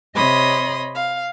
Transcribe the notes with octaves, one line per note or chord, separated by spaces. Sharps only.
C3 C#5 D#5 B5 C6 D#6
F5